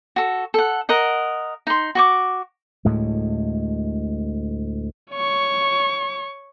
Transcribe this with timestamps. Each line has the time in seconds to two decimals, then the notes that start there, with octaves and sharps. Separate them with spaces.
0.16 F#4 A4
0.54 A4 F#5
0.89 A#4 D#5 F#5
1.67 D#4 C6
1.95 F#4 C#6 D6
2.85 D2 A2 G#3
5.12 C#5 C#6